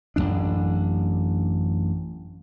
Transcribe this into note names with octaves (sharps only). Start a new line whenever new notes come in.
A1 F#2 A2 D4